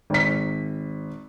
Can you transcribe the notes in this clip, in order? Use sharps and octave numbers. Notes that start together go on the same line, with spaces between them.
G#1 B6